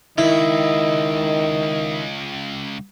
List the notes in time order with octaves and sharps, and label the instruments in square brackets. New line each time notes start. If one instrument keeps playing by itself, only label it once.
[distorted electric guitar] C#2 [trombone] D#3 [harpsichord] E4 [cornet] D#5